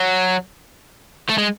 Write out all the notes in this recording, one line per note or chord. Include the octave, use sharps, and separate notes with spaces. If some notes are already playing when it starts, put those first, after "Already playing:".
Already playing: F#3
A3
G#3